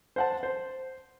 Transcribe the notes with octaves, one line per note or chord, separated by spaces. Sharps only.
C5 F#5 A5
C5